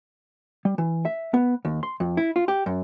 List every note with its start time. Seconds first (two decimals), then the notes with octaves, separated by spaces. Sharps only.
0.65 G3
0.78 E3
1.05 E5
1.34 B3
1.65 D#2
1.83 C6
2.00 F2
2.17 E4
2.36 F4
2.48 G4
2.66 F#2